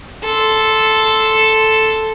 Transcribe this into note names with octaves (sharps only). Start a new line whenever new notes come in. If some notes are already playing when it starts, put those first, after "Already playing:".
A4 C6